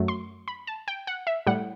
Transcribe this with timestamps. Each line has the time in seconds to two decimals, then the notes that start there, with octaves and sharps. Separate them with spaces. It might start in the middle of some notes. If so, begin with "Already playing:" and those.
Already playing: F#2 F#3 A3
0.08 C6
0.48 B5
0.67 A5
0.88 G5
1.07 F#5
1.27 E5
1.46 A2 G3 F#5